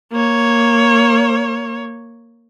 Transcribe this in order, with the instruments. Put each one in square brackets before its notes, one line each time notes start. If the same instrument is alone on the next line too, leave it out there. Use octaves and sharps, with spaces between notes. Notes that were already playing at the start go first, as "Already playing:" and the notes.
[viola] A#3 C#5